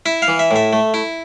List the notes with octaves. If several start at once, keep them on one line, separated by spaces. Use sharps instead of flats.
E4 E5
F5
E3
E5
A2 E5
A3
E4